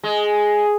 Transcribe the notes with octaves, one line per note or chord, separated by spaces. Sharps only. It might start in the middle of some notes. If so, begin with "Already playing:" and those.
G#3